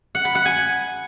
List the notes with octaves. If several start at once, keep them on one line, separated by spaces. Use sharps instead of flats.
F#5
B5
F#5
G#5